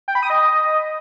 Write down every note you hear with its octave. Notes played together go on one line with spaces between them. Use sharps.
G5
B5
D#6
D#5